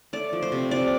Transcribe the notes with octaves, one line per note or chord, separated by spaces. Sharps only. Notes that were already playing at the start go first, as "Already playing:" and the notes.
A3 D5
F3
C5
C3
C3 D5